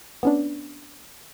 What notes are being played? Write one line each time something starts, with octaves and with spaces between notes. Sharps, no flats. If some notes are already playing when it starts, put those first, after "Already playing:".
B3 C#4 D4